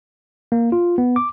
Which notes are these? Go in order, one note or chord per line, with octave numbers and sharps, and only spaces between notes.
A#3
F4
B3
D6